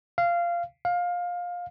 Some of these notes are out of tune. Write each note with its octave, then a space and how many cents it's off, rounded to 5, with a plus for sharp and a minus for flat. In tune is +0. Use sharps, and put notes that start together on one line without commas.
F5 -15
F5 +20